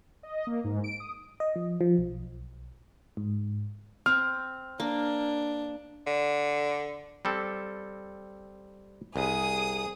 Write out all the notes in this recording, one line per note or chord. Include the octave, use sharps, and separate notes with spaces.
D#5
A#3
G#2
D7
D#6
D#5
F3
F3
B1
G#2
C4 F6
A#3 D4
D3
G3 C4 A4
C2 G#4 D#6